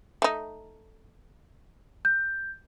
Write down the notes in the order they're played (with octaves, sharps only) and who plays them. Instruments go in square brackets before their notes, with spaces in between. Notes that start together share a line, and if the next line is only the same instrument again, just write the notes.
[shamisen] A3 D#4
[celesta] G6